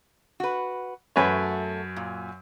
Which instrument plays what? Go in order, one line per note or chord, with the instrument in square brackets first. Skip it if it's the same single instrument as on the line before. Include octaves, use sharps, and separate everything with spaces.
[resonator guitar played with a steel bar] F#4 B4
[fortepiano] F#2 B4 C#5 [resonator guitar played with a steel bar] F#3 A3
[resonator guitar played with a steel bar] A#2